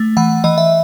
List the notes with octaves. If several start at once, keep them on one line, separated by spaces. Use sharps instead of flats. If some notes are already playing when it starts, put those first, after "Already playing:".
Already playing: A3
E3 F#5
E3 D#5
E5